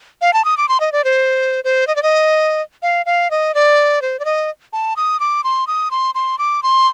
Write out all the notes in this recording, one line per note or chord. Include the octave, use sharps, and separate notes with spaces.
F5
A5
D#6
D6
C6
D#5
D5
C5
C5
D#5
D5
D#5
F5
F5
D#5
D5
C5
D5
D#5
A5
D#6
D6
C6
D#6
C6
C6
D6
C6